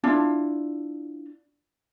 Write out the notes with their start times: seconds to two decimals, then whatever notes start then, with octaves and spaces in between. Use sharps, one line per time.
0.04 D4 E4 F4